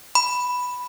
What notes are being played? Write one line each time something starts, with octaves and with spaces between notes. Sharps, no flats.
B5